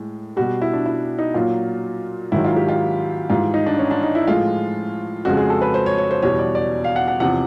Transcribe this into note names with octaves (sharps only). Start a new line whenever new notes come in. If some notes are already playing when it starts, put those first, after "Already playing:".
Already playing: A2 G#3
B2 G3 F#4
E4
D4
E4
D#4
A#2 F#3 F4
G#2 D#3 F#3 E4
F4
G4
F4
G#2 E3 G3 F4
D#4
D4
C#4
D4
D#4
E4
A2 F3 G#3 F4
F2 C#3 F3 G#3 F#4
G#4
A4
B4
C5
C#5
C#5
C5
E2 B2 G3 C#5
D5
D5
F5
F#5
F#5
E2 C3 F3 F#5